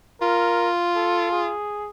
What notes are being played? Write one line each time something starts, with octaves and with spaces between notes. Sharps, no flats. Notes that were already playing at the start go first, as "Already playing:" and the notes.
F4 A#4
A4
G#4